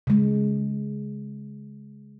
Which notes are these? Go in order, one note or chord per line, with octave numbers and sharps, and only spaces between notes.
C#3 G#3